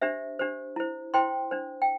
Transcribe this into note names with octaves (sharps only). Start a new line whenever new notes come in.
D4 G4 C5 E5
D4 G4 C5
E4 C5
E4 C5 G5 C6
D4 C5
G5